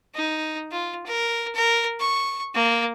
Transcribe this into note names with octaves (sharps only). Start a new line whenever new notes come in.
D#4
F4
A#4
A#4
C#6
A#3